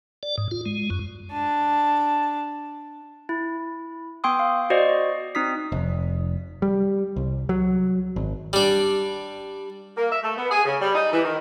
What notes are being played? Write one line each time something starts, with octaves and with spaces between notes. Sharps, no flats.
D5
G#2
F4
G#3
F#2
D4 A5
E4
B3 G5 C6 D#6
F5
F#4 C5 D5 D#5
C4 D#4 D#6 B6
F1
G3
C2
F#3
G#1
G3 D4
A#3
E5
A3
B3
G#4
C#3
G3
D#4
E3
D#3